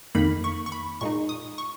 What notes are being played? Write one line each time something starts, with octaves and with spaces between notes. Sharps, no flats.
F2 D#3 A#3 D#4 B5
C#6
C#6
B5
A#2 G#3 D#4 C#6
D#6
C#6